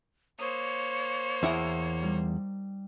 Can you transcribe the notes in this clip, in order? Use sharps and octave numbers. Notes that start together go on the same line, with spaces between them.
A#3 C5 C#5 D#6
E2 E4 F#5
G3 D#4